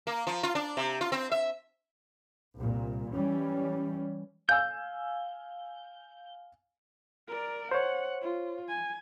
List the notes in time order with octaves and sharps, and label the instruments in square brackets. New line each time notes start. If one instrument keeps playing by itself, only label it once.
[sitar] A#3
F3
F4
D4
C3
F4
C4
E5
[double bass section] C2 A#2
E3 G3 C#4
[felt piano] F5 G#5 E6 [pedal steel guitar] G6
[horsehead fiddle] A#4 D5
[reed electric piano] C5 C#5 [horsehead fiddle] F#5
[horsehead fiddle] F4
G#5